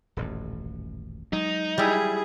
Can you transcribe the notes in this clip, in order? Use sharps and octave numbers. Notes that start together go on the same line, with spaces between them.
D#1 A1 F#2
F#3 G#3 D#4
G3 E4 G#4